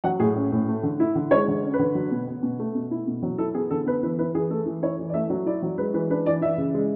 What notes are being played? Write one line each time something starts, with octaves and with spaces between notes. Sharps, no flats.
F#3 F#5
A2 G#4
C#4
A2
A3
D3
E4
D3
G#3 C#5
D3
C#4
B4
D3
F#3
B2
B3
B2
A3
B2
E4
B2
F#3
E4 A4
B3 G#4
D3 A4
B3 B4
E3 B4
E4 B4
E3 G#4
A3 A4
E3
E4 C#5
E3
D5
A3 E5
F#3
E4 D5
F#3
G#3 B4
E3 B4
D4 B4
E3 D5
E3 E5
C#3
G#3